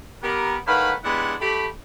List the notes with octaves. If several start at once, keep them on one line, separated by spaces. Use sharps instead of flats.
B3 G4 A#4
A2 D#3 B4 F5 F#5 B5
G#3 B3 D4 E4 G4 F#5
A3 G4 B5